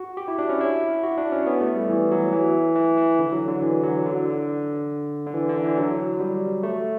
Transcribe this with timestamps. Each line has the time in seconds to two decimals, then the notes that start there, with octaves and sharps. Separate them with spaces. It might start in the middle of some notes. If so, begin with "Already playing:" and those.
Already playing: F#4
0.17 G4
0.28 E4
0.39 D4
0.49 C#4
0.61 E4
1.03 F#4
1.18 D4
1.32 C#4
1.46 B3
1.61 A3
1.75 G3
1.89 E3
2.11 F#3
2.32 E3
2.76 E3
2.97 E3
3.19 D3
3.33 F#3
3.48 D3
3.62 E3
3.83 F#3
4.06 D3
4.31 D3
5.27 D3
5.34 E3
5.49 D3
5.63 E3
5.77 F#3
6.20 G3
6.63 A3